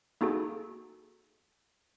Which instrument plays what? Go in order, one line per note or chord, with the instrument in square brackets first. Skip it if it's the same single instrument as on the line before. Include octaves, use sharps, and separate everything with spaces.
[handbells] A#3 D#4 F#4 G#4 A4